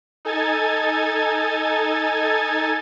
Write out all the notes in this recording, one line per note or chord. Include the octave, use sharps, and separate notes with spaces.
D#4 A4 G#5 G#6 A6